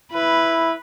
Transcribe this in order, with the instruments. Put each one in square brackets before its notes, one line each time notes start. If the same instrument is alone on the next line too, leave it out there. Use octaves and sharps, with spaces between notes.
[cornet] E4 [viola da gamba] B4